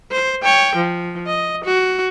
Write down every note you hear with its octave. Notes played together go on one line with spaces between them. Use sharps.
C5
C#5 G5
F3
D#5
F#4